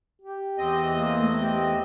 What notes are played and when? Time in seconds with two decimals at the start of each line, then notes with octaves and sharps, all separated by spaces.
0.22 G4
0.58 E2 C4 D#5
0.95 A#3
1.20 A3
1.42 G4